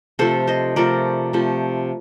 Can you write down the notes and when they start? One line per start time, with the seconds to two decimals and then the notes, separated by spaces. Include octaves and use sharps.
0.19 C3 F3 A3 A4 C5
0.47 C5 D#5
0.76 C3 F3 A3 A#4 D5
1.33 C3 F3 A3